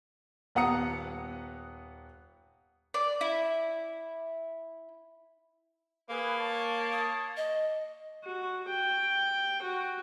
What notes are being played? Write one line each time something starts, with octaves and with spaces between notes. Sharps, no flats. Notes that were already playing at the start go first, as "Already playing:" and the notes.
D#1 B3 F#5 A#5 D#6 C#7
D5
E4
A#3 G#4 B4
C#5 A5
D#6
D#5
F#4
G5
F#4